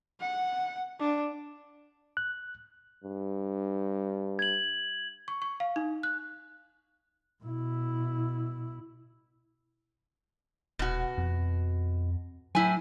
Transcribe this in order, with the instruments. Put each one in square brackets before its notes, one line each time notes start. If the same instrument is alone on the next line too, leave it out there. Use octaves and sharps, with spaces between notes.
[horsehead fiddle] F#5
D4
[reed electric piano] F#6
[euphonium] G2
[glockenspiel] G#6 F#7
[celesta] C#6
C#6
F5
D#4
F#6
[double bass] B2 E4
[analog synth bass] D#1 [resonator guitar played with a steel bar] B2 F#4
[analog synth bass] F2
[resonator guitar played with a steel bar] A2 E4 G#5 [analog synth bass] F#3